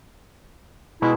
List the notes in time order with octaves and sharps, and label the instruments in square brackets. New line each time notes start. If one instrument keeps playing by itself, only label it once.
[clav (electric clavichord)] B2 G#3 [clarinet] E4